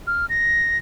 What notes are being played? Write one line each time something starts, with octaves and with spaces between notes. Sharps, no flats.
F6
A#6